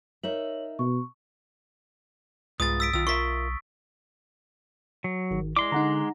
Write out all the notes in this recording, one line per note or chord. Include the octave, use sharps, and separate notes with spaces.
D#4 A#4 C#5 E5 F#7
B2 C#6
C2 G#2 B3 F4 D#6 A6
E6 B6 D7
B1 D#3 F4 E6
F4 A#4 E5 C#6 B6
F#3
G#1 D#3
G#3 E4 D5 C6 D6
D3 D#4 F#5 A#5